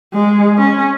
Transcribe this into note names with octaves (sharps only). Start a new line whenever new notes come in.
G#3
C#4